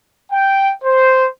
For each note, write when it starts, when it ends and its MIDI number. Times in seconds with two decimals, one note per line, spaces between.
0.32 0.71 79
0.84 1.27 72